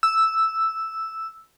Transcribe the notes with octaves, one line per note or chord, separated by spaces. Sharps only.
E6